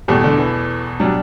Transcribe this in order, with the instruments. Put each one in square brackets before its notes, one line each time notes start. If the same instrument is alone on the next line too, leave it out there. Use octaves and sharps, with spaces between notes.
[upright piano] E2 B2 A3 [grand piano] G3
[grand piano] D3
E3
[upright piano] B2 G3 D4 [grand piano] F#3